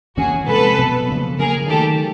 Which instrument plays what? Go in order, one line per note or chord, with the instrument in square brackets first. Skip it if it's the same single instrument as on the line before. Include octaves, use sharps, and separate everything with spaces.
[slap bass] E3 G3 A#3 C#4 [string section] F#4 G#4
[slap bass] C3 F3 G#3 [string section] A4 B4
[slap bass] B2 F#3 B3
C#3 F3 A#3
[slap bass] C#3 F#3 A#3 [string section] G#4 A#4
[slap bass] D#3 F#3 A3 [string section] G4 A4